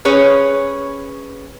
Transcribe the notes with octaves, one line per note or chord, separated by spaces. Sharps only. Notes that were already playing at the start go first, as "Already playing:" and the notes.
C#4 G#4 B4 C#5